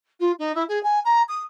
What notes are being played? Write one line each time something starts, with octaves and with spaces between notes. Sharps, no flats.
F4
D#4
E4
G#4
G#5
A#5
D#6